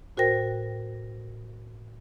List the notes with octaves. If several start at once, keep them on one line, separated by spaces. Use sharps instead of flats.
A2 F#4 A#4 C5 G5 A#6